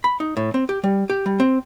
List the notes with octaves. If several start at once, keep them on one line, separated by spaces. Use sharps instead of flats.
B5
D#4
A2
C4
G4
G3
G4
G3
C4